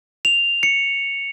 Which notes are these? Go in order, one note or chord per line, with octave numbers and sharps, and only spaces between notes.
F7
C#7